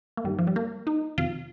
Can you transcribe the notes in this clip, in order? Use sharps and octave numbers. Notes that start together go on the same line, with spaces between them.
A#3
G2 D#3 G3
F3
G3
A#3
D#4
F2 C3 D#3 F4